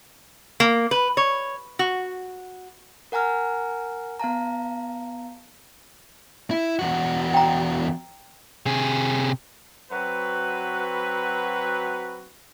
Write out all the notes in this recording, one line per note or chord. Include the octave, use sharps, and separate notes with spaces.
A#3
B4
C#5
F#4
A#4 F#5 G#5 A#5 F6
B3 F5 A5 A#5
E4
E2 F#4
G5 A#5
C3 G#4
F#3 C4 F#4 B4